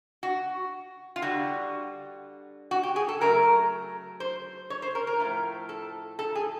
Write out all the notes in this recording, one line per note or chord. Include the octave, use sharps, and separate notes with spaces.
F#4
F4
D3 G3 F#4
F#4
G4
G#4
A4
C#3 F#3 A3 A#4
C5
C#5
C5
A#4
A#4
A2 F3 A3
A4
A4
G#4